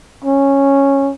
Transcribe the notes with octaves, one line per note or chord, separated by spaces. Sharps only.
C#4